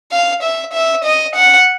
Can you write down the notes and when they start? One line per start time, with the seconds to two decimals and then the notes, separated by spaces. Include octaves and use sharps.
0.12 F5
0.43 E5
0.73 E5
1.04 D#5
1.35 F#5